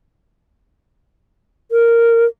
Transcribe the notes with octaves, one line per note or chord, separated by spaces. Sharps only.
A#4